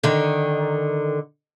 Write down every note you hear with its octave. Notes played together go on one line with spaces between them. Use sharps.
D3 D#3